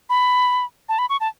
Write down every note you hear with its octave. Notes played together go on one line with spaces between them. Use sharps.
B5
A5
B5
C#6
A5